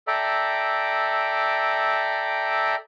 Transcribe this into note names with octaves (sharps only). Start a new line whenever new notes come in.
A4 D5 E5 G5 A#5